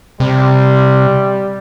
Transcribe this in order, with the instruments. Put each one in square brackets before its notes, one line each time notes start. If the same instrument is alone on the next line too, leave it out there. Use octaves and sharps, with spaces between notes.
[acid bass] C3 [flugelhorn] G3